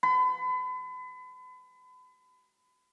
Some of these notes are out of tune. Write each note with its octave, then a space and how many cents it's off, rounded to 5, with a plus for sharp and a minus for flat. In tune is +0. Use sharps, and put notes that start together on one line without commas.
B5 +35